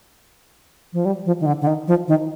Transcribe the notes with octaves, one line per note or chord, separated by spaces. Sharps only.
F3
G3
F3
D#3
D3
D3
D#3
F3
D#3